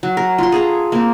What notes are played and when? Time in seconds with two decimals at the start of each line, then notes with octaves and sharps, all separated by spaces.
0.03 F#3
0.17 A#4
0.38 F4 C6
0.52 G#4 A4 A#5
0.92 A#3 C4